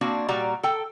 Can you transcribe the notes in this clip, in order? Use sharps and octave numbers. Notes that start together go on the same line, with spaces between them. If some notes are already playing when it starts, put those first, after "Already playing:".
A#3 C4 D4 F#4
A#2 G3 F#4 D5 A#5
A4 G5